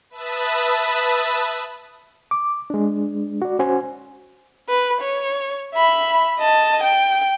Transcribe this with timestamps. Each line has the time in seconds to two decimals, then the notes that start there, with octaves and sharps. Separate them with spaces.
0.10 B4 E5 A5 B5 D#6
2.31 D6
2.70 G#3 D4
3.42 F#4 D5
3.59 C#4 F#4 C5 G#5
4.69 B4
5.01 C#5
5.75 E5 B5
6.39 D#5 A5
6.83 G5